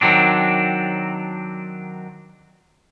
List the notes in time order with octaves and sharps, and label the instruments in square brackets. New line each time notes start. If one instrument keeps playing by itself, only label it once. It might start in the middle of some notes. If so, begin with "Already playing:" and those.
[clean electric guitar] D#3 F#3 C4 D4